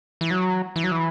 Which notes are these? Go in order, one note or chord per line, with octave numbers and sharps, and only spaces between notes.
E3
F#3
E3
F#3
E3